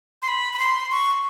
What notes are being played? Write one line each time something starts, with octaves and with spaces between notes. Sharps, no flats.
C6
B5
B5
C6
C#6